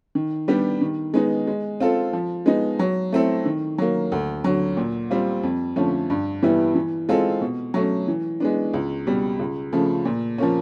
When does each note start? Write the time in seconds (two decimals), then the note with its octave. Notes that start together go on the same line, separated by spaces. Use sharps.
0.15 D#3
0.48 G3 B3 D4 G4
0.81 D#3
1.14 G#3 B3 D#4
1.47 G#3
1.80 C4 F4 A4
2.13 F3
2.46 G#3 B3 D#4
2.79 F#3
3.12 A3 C4 E4 A4
3.45 D#3
3.78 F#3 A#3
4.12 D2
4.44 D3 F#3
4.77 A#2
5.10 G3 C4 F4
5.43 F2
5.76 D3 F3 A3 C#4
6.10 G2
6.43 E3 G3 B3 E4
6.75 E3
7.09 G#3 C4 F4 A4
7.41 B2
7.74 F#3 A3 C#4
8.08 E3
8.40 G#3 B3 D4
8.74 C#2
9.07 B2 G3
9.39 C#2
9.73 C#3 F3 A3
10.05 A#2
10.38 F3 A#3 C#4